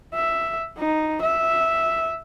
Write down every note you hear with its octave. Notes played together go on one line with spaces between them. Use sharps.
E5
D#4
E5